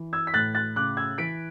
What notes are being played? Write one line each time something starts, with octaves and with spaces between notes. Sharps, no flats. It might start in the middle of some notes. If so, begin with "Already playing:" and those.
Already playing: E3
E6 G#6
B6
A2 F#6 A6
F#6 A6
C#3 D6 F#6
E6 G#6
E3 B6 D7